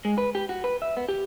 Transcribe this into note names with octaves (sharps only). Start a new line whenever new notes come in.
G#3
B4
G4
F#4
B4
E5
B3
G4